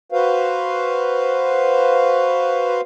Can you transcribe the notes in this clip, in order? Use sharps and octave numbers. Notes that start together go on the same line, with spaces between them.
F#4 B4 C5 F5